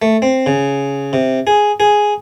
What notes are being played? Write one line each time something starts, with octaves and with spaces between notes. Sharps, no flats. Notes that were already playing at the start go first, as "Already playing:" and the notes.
A3
C4
C#3
C3
G#4
G#4